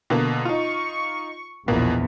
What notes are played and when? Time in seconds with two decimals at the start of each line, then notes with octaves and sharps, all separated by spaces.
0.10 B2 D3 A#3
0.45 D#4 F4 C#6
1.68 A#1 E2 B2 A#3